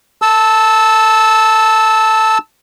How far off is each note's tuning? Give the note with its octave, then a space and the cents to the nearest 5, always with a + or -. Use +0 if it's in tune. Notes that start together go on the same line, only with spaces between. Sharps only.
A5 +0 E6 -15